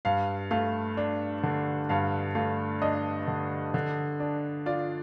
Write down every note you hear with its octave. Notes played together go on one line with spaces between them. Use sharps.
G2 F5
A3 F5
D4
D3
G2 F5
A3 F5
D4 D#5
D3
D3
D4
F4 D5